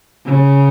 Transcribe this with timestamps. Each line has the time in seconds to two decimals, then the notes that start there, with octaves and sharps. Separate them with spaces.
0.25 C#3